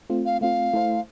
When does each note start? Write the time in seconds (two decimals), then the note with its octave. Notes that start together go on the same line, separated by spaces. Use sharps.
0.10 A3 C4 F4
0.26 F5
0.41 A3 C4 F4 F5
0.74 A3 E4 A4 C5